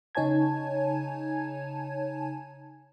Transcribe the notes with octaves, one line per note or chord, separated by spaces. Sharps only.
C#3 D#4 C#5 G#5 A5 G#6